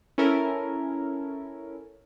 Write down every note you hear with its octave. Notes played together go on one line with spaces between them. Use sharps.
C#4 E4 A4 A#4